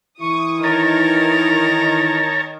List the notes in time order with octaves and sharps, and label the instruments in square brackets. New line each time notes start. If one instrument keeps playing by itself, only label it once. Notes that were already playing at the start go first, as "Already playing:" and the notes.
[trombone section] E3 E4 [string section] C#6 D#6
[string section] D#3 [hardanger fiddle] A#4 [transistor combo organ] C#5 A5 A#5